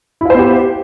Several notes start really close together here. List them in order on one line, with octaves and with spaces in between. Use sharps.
E4 F4 C5 B3 G4